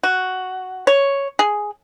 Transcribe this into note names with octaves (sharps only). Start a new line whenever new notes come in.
F#4
C#5
G#4